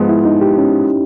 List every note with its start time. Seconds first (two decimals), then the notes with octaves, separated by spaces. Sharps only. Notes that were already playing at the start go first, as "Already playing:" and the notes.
Already playing: G#2 F3 G#3 B3
0.09 E4
0.25 D#4
0.41 G4
0.58 C#4